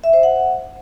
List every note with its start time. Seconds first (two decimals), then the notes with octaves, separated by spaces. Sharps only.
0.04 E5
0.13 C5
0.23 F#5